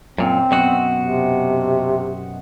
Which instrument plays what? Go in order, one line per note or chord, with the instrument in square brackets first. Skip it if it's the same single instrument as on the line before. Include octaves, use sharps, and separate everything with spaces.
[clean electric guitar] F#2 A#2 [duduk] C4
[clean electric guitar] F#2 B2 F#4
[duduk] C3